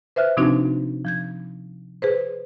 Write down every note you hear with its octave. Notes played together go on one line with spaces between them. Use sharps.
B4 C5 E5 F6 F#6
C3 F3 C4 D4 D#4 F#4
F3 G6 G#6
G#4 B4 C5